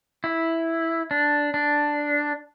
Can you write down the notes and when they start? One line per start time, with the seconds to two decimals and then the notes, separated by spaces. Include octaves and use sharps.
0.24 E4
1.11 D4
1.54 D4